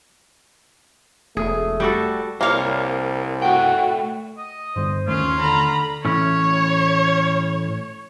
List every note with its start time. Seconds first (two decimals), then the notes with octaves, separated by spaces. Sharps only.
1.37 E1 A3 G#4
1.80 G3 F#4 A4
2.41 C2 A#3 C5 C#5 F5
3.42 A3 F#4 G5
4.37 D#5
4.76 G2 D3 G3 C5
5.08 D#2 D#3 A3 C#4 F4
5.40 D3 A#5 B5
6.05 A2 E3 C#4 C#5